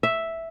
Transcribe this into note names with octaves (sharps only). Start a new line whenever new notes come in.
E5